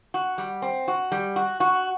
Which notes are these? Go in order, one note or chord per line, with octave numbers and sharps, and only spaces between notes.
F#4
G3
C4
F#4
G3
F#4
F#4